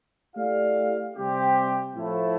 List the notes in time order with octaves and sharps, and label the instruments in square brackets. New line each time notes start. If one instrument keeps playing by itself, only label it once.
[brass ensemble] A3 E4 G4 D5 F5
C3 G3 C4 G4
A2 F3 A3 E4